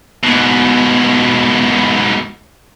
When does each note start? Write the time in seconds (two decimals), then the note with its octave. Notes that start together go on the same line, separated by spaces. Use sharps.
0.23 G#2 B2